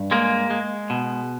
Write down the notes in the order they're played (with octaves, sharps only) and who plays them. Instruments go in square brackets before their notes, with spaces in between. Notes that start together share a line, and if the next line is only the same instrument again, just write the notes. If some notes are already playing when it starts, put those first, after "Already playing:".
Already playing: [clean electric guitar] G2
G#3 A#3
G#3
B2